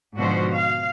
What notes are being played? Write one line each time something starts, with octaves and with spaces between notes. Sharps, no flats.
G#2 B2 D3 F3 F#4 C5
F5